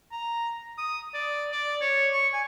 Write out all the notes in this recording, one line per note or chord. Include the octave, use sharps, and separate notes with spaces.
A#5
D#6
D5
D5
C#5
C#6
G#5